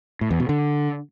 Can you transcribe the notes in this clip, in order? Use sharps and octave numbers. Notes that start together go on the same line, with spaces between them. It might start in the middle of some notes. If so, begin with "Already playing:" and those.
A2
E2
B2
D3